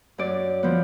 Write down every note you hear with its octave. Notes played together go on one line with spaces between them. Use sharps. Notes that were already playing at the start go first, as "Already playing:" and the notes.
F#2 D5
F3 B3